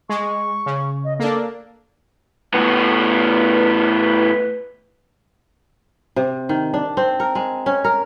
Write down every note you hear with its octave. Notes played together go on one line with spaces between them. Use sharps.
G#3 C#6
C#3
D#5
A#3 D4 A4
A2 B3 B4
C3
D#3
D4
C4
A#4
G#3
C#4
A#4